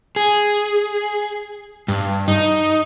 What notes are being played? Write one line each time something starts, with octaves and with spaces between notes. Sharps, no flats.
G#4
G2
D#4